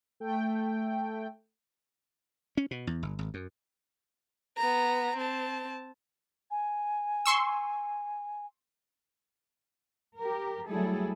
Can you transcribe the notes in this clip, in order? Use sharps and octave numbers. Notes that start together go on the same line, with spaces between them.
A3 G5
C#4
B2
E2
G1
G#1
F#2
B3 A#5
C4 A5
G#5
C6 C#6 E6
G4 A#4
D2 F#3 G3 E4 G#4 A4